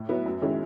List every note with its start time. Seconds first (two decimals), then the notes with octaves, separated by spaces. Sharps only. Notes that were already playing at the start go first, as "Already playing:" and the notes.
Already playing: A2
0.09 F#3 B3 E4
0.26 F#2
0.42 D#3 G#3 C#4 E4